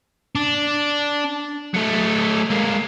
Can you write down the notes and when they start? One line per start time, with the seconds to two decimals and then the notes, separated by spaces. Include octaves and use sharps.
0.35 D4
1.74 F#3 A3
2.51 G#3 A#3